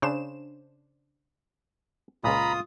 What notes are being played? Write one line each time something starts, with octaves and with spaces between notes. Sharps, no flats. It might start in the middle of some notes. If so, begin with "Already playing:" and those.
C#3 D4 C5 E7
C#2 A#2 F4 A#5 B5 D#6